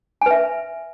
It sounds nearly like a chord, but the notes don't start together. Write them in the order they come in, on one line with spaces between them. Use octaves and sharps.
G#5 B4 E5